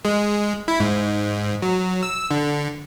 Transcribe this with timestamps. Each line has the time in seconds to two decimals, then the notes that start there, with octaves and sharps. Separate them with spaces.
0.05 G#3
0.68 E4
0.80 G#2
1.62 F#3
2.03 E6
2.31 D3